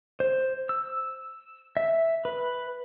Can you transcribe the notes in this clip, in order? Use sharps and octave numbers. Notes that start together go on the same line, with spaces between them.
C5
E6
E5
B4